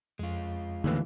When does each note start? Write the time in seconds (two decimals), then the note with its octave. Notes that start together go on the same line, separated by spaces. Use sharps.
0.19 F2 G#3 F4
0.84 D#2 A2 D3 E3